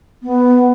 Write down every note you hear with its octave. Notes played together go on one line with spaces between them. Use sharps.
B3